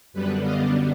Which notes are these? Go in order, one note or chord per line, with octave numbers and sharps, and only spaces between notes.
F#2 D3 G3 B3 D4 B4
D#5 F5